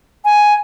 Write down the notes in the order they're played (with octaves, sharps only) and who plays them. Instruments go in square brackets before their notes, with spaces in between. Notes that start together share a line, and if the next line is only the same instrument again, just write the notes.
[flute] G#5